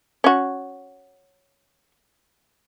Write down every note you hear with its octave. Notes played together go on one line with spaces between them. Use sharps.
C#4 F#4